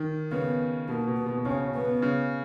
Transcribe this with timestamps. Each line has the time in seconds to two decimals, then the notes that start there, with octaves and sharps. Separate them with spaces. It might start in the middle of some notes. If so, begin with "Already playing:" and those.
Already playing: D#3
0.31 C#3 B3
0.88 B2 A#3
1.07 B2
1.16 B3
1.26 B2
1.38 B2
1.45 C#3 C#4
1.75 B3
2.02 C#3